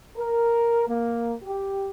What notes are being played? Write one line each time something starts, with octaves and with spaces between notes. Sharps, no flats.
A#4
A#3
G4